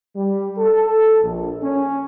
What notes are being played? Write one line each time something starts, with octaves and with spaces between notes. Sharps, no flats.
G3
A4
A#1
C#4